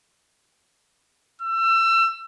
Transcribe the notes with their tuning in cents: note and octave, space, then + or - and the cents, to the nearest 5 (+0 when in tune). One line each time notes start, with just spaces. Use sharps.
E6 +30